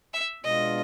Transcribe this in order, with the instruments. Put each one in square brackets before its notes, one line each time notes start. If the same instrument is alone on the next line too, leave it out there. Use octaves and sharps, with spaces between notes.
[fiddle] E5
[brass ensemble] B2 G#3 B3 D4 F4 [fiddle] D#5